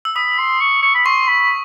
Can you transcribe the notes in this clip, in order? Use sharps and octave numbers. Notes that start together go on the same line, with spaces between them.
E6
B5 D#6
C6
C#6
C#6
B5
C6 C#6
B5